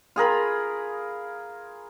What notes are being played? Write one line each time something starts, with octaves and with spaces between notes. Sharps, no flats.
F4 G#4 A#4 B5